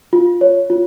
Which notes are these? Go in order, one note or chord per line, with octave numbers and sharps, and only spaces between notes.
F4
C#5
F4